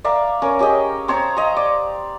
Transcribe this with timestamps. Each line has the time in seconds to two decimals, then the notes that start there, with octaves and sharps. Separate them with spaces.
0.04 D5 E5 F5 A#5
0.42 C#4 A#4
0.59 C#4 G4 G#4 D#5
1.08 C4 C#5 A5 A#5
1.37 D#5 F5 A#5
1.57 D5